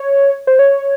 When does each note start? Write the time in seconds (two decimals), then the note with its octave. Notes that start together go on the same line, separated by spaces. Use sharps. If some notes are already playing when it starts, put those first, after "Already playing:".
Already playing: C#5
0.47 C5
0.59 C#5